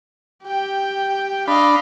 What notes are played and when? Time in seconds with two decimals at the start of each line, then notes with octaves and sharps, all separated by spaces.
0.44 G4 G5
1.48 D4 D#5 F5 B5